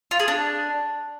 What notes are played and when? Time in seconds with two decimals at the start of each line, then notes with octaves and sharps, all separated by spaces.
0.11 F4
0.20 G#4
0.28 D4